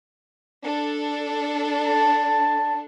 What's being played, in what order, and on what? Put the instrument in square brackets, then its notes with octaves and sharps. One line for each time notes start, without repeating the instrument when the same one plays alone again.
[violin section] D4 A4
[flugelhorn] A5